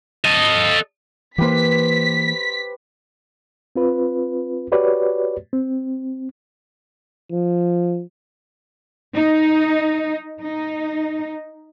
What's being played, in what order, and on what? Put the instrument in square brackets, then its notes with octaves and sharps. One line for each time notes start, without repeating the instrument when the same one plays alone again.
[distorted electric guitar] A4 D#5
[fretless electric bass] E3 A#3 [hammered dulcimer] G4 B4 C5 [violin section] B6
[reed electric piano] C4 F4 B4
F#4 G4 B4 C#5 D5
C4
[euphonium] F3
[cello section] D#4
D#4